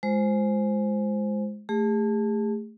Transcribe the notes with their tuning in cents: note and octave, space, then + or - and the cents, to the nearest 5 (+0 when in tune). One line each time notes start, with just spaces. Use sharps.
G#3 +10 F4 +0 C5 +0
A3 +0 G#4 -40